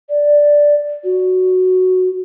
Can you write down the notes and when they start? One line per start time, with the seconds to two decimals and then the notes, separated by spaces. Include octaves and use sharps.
0.09 D5
1.04 F#4